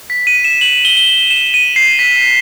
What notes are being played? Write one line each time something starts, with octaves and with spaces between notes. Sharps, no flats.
B6
D#7
E7
F#7
G7
G7
F#7
E7
D#7
C7
B6